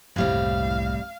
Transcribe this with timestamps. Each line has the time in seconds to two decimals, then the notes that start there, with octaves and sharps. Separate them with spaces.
0.16 F#1 C2 A2 G3 C4 F5